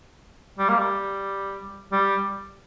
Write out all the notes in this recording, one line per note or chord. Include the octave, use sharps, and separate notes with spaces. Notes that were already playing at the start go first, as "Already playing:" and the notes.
G3
A#3
G3
G3